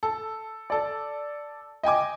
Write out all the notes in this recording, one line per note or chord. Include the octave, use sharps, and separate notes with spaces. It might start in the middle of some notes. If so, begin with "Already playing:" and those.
A4
A4 D5
D#5 G5 G#5 D6